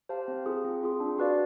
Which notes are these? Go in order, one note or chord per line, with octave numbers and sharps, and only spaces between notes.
G4 C5 F5 A5
C4
F4 G#4
C4
F4 G#4
D4
F#4 B4 D5 F5